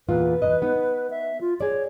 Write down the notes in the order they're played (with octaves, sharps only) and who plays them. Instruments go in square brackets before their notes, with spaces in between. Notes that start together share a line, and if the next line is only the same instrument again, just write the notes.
[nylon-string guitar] E2 A#2 F4 [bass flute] B4
[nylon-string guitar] E2 B2 D#5
B3 D#4
[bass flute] E5
F4
[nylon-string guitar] G#4 D5 [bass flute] C#5